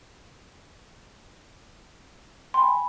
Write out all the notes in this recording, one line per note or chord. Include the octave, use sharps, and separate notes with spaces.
G5 G#5 B5 C6